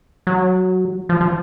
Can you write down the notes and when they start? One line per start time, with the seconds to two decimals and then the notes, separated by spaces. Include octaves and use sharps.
0.27 F#3
1.09 F3
1.21 F3